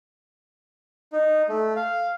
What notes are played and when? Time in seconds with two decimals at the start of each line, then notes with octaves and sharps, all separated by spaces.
1.13 D#4
1.49 A3
1.76 F5